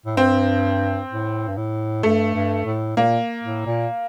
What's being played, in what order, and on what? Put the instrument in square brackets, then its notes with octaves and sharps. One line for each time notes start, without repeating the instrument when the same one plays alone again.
[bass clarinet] A2
[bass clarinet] G2 [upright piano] C4
[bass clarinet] A2
G2
A2
[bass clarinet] G2 [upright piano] A3
[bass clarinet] G2
A2
[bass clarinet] A#2 [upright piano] A#3
[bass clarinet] A2
A#2